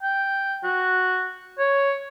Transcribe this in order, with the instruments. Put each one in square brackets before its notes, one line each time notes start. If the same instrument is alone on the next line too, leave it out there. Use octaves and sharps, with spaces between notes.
[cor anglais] G5
F#4
C#5